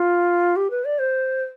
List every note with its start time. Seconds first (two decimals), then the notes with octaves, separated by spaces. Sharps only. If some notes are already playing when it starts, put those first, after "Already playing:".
Already playing: F4
0.56 G4
0.71 B4
0.85 D5
0.99 C5